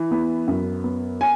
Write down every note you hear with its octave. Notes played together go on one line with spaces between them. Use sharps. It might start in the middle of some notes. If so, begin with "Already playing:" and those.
Already playing: E3
B3
F#2
B3
G#5